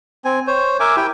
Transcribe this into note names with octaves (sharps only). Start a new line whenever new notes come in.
C4 G#5
C5 C#5
A#4 E5 G#5 D6
E4 G4 G5